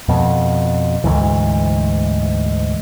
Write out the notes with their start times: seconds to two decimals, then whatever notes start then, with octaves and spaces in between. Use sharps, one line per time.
0.09 F2 B2
1.04 D2 G#2 E3